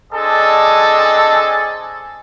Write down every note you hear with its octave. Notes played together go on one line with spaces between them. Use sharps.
C4 D4 G#4 A4 D#5 A5